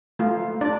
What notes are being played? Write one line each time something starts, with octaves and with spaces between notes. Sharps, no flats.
A3 F4
D4 D5